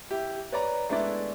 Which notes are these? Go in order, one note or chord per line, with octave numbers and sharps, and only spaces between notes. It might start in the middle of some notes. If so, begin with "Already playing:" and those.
E4 G4
B4 C#5 D5 A#5
G#3 A3 B3 D4 E4 D5